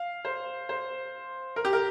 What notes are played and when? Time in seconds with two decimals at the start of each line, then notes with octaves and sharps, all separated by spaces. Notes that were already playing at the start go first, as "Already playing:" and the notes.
Already playing: F5
0.25 C5
0.69 C5
1.56 A#4
1.65 G4
1.73 A#4